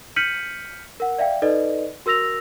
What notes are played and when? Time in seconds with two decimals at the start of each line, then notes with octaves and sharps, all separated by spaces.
0.16 F6 G6 B6 C#7 D#7 F#7
1.00 A#4 F#5
1.18 D5 E5 F5 G5
1.42 D#4 A4 B4 D5 D#5
2.06 F#4 A#4 E6 A#6 F7